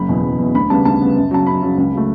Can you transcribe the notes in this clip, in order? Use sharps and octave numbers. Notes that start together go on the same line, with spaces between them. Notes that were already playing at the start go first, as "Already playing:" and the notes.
Already playing: F#1 B5
E2 B2
F#1
E2 B2
D2 B5
C#3 G3 B3 A5
D2 A5
C#3 G3 B3
F#2
C#3 F#3 A5
F#2 B5
C#3 F#3
C#2
C#3 F#3 A3